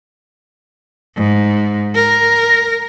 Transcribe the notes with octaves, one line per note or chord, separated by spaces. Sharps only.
G#2
A#4